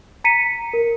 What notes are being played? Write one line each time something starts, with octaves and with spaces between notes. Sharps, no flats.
A#5 B6 C#7 D#7
A#4